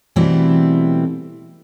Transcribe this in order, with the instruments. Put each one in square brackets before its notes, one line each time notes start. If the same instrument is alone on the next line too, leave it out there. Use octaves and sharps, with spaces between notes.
[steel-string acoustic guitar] B2 E3 G3 A3 C4 E4